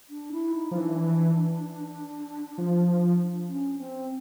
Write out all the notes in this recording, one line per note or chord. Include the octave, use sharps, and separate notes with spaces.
D4
E4
D#4
F3
E3 D4
F3
C#4
C4